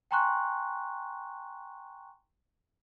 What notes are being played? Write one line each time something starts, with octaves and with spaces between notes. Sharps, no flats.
G5 G#5 A#5 C6 C#6 F#6